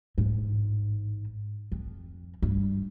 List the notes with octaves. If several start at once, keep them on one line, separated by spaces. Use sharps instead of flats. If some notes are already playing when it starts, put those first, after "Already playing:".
A1 G#2
F2
G2